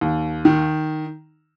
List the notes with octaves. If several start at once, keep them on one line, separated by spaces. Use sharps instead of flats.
D#2
D#3